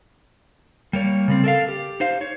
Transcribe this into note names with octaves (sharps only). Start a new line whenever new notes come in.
G3 A#3 C#5
C#3 G3 C4
A4 A#4 D#5 F5
G4
D#4 C5 F5
C#5